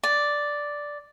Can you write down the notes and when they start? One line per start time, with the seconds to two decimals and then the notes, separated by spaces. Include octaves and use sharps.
0.03 D5